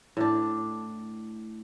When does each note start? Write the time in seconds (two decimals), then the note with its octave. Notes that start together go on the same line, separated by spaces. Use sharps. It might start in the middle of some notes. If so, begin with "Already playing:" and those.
0.17 A2 D4